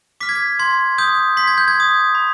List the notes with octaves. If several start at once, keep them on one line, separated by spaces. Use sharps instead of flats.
D6 F6 B6
G#6
B6
C6 G#6
D#6 G6
C6 B6
G#6
G6
G#6
D#6 G6
B5